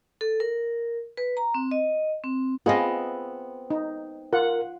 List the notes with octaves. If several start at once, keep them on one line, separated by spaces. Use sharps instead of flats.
A4
A#4
B4
A#5
C4
D#5
C4
B3 C4 F4 G#4 D#5
D#4
F4 A#4 F#5